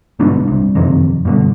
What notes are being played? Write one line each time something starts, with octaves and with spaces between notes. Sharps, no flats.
G1 G#2 B2 D4
C2
F#1 F2 C3 D#3
G2 B2 D3